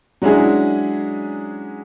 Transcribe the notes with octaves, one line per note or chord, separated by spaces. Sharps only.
F#3 G#3 C#4 D4 E4 G#4